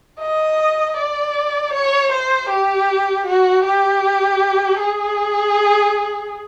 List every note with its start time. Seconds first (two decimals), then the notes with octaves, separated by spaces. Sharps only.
0.20 D#5
0.97 D5
1.73 C#5
2.12 C5
2.49 G4
3.26 F#4
3.64 G4
4.79 G#4